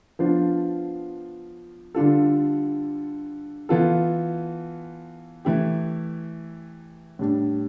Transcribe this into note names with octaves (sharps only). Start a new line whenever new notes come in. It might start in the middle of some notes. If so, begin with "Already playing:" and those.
F3 B3 D4 F4 C5
D3 G3 D4 F4 A4
E3 B3 F4 A4
E3 A3 E4 G4
A2 G3 D4